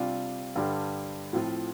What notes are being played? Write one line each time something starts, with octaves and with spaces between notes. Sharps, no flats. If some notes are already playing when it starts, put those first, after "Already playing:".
Already playing: C3 G3 D4 F4
G2 D3 G3
A2 F3 C4 F4